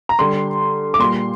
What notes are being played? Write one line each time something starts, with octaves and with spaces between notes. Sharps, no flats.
A#5
D3 G3 C6
D6
A#2 G3 C6